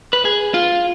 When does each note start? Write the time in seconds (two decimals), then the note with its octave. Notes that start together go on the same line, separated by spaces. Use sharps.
0.13 B4
0.25 G#4
0.54 F4